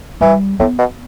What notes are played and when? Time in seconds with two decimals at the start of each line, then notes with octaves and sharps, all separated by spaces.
0.21 E3 G3
0.59 A2 B3
0.78 B2